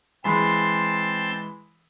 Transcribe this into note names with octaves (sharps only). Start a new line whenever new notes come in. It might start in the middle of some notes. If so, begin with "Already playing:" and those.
E3 G#3 C4 A5 B5 C6